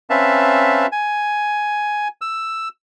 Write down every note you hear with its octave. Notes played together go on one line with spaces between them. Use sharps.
C4 C#4 B4 E5 F5 A5
G#5
E6